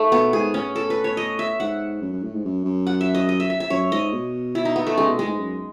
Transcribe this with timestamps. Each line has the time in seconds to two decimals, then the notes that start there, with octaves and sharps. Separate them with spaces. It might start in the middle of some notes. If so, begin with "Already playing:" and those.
Already playing: A3 D#4
0.12 B2 B3
0.33 G#2 G#4
0.54 A2 C#4
0.76 A4
0.90 B4
1.04 C#5
1.17 D#5
1.39 E5
1.60 G#2 F#5
2.02 F#2
2.13 F#2
2.23 A2
2.34 G#2
2.45 F#2
2.65 F#2
2.87 F#5
3.01 E5
3.14 D#5
3.29 D#5
3.40 E5
3.50 E5
3.60 E5
3.70 F#2 C#5
3.92 G#2 D#5
4.13 B2
4.55 E4
4.65 D#4
4.76 B3
4.87 A3
4.97 C#3 G#3
5.08 B2
5.18 A2 G#3
5.28 G#2
5.39 F#2